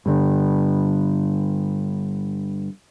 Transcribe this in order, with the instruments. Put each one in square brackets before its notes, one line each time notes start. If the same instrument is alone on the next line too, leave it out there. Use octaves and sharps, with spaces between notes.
[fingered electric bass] G2 D3